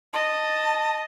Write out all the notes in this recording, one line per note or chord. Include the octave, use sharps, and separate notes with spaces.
D#5 A5